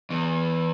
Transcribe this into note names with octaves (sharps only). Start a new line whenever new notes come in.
E2